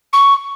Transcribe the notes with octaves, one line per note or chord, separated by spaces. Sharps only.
C#6